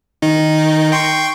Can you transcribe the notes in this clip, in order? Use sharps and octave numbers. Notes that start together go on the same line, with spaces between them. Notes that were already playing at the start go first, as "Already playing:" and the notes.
D#3 D#4
G5 C6 C#6